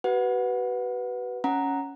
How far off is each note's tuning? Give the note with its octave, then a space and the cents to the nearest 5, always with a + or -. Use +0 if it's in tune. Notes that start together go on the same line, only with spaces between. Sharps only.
F#4 +40 B4 +0 F#5 -10
C#4 +0 F#5 +0 A#5 +0